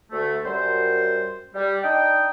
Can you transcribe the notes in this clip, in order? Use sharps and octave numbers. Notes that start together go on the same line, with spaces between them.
D2 A3
F#2 G3 C5
G3
D4 D#4 D#5 G5